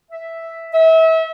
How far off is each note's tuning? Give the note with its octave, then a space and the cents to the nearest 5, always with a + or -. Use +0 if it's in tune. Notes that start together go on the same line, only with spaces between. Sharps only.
E5 +0
E5 -30